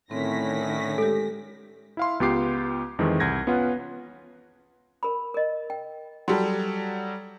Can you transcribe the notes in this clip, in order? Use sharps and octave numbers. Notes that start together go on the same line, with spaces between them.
A2 D3 D#3 C4 C#4 A#6 B6
G#3 G4 A4
E4 F5 C6
C#2 B3 F4 G4 D6 C7
F2 D#3 E3 G#3
C2 G#6 A#6
B3 C#4 F4 B4 F#5
A#4 B5
A#4 D#5
G5
F#3 G3 A4 C6